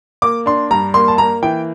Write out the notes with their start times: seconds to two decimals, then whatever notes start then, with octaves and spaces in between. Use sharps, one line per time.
0.22 A#3 D6
0.46 D4 C6
0.71 G2 A#5
0.94 A#3 C6
1.08 A5
1.18 A#3 A#5
1.43 E3 G5